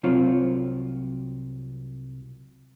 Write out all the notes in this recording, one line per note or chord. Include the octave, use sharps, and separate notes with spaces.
C2 F#3 C4 F4 C#5